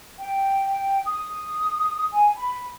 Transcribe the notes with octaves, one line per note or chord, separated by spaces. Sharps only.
G5
D#6
G#5
B5